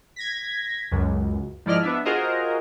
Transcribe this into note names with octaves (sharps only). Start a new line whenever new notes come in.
G#6 A#6 B6
C#2 F#2
G#2 F3 E4 D5 D#5 F6
B3 D4 E5
F4 F#4 G#4 A#4 C5 D#5